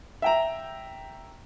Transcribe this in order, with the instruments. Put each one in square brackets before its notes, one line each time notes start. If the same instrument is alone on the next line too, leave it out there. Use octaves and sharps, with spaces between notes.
[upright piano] E5 G5 A#5